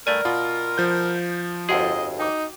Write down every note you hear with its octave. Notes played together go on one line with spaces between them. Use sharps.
G2 A3 A#4 D5 G#5
B2 F4
F3 G6
G1 F2 F#4 G#4 D#5 E5 F#5
D#4 G5 D6